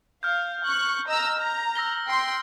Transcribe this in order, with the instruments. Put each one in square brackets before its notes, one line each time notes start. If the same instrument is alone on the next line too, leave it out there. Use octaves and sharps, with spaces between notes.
[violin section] F5 [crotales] F6 G6
[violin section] C#6 F#6
D#5 A#5 E6
A#5
[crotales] E6 A#6 G7
[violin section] G5 C6